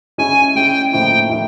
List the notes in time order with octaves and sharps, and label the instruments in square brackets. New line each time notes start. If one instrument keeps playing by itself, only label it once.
[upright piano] G#3 C#4 E4 [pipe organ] G#5
[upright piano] G#3 C#4 E4 [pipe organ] G5
[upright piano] A2 F3 A#3 D#4 [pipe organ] G5
[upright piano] A2 F3 A#3 D#4